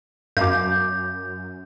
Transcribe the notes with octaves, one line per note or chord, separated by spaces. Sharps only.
F#2 F5 D6 G6